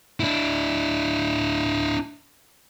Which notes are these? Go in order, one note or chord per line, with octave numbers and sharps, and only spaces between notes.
D4 E4